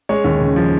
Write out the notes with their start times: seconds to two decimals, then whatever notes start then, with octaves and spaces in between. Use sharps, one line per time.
0.09 G#3 C#5
0.24 D#2
0.41 C#3
0.56 F3